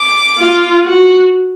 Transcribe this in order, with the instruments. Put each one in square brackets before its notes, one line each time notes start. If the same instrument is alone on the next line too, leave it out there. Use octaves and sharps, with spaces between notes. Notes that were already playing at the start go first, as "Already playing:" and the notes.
Already playing: [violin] D6
[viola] F4
F#4